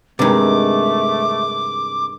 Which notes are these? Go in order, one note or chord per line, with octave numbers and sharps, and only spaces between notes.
G2 C3 D#3 G#3 A3 D6